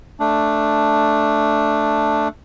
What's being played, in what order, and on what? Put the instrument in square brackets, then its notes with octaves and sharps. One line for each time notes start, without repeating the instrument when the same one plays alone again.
[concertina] A3 D4